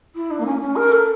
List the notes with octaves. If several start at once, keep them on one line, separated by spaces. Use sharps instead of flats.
E4
D4
A#3
C#4
C#4
A#4
A4